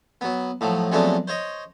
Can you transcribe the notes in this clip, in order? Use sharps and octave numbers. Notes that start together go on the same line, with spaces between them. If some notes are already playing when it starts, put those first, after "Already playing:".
F#3 B3
A2 F3 F#3
F2 F#3 G#3 A3 B3 D4
C5 C#5 D#5